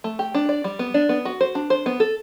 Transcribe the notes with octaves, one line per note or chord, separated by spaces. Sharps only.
A3
G4
D4
D5
G3
B3
D4
B3
F#4
C5
D4
C5
B3
A4